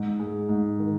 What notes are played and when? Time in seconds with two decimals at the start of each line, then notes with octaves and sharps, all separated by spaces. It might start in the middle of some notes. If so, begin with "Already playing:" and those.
Already playing: G#2
0.20 G#3
0.49 G#2
0.79 D#3